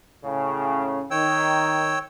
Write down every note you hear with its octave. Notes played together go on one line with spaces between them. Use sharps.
A2 C#3
D#3 C#5 G5 E6